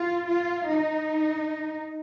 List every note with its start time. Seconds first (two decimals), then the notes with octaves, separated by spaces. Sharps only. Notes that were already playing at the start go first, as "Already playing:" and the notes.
Already playing: F4
0.30 F4
0.70 D#4